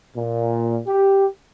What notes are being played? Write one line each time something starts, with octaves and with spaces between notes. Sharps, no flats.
A#2
G4